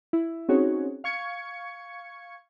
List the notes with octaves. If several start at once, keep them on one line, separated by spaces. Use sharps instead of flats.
E4
C4 C#4 D#4 F#4 G#4 C#5
F5 C#6 G#6 C#7